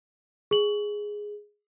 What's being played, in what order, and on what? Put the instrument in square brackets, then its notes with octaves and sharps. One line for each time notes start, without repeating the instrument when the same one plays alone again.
[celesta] G#4 F#7